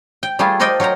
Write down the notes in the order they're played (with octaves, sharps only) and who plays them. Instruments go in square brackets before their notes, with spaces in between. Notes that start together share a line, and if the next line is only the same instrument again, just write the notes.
[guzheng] G5
G3 A3 F4 G#4 A4
A4 A#4 C5 D5 D#5 G5
F#3 A#4 C5 G5 A#5